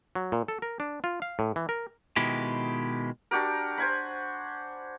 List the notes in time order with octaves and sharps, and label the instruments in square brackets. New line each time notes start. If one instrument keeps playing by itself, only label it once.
[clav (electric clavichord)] F#3
A#2
A4
A#4
D4
F4
F5
A2
E3
A#4
[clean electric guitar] B2 D#3 G#3 E4 G4
[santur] D4 F#4 G4 A#4
C5 G#5 B5